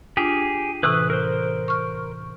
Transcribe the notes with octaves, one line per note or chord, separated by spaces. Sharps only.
D4 F4 G4 G#4
A2 C3 E3 B4 D#6 F#6
A#4 C5
C#6 F6